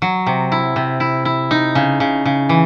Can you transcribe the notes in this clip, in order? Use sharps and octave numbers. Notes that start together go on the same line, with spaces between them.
F#3
C3
E4
C3
E4
E4
D#4
C#3
C#3
C#3
E3